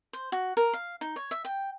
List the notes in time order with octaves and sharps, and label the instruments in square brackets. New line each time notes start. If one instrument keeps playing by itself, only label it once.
[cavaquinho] C5
F#4
A#4
F5
D#4
C#5
E5
G5